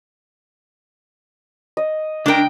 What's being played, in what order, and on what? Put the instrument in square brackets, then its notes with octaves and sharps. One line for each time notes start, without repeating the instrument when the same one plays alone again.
[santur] D#5
[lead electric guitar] C#2 G5 [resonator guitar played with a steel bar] D4 A#4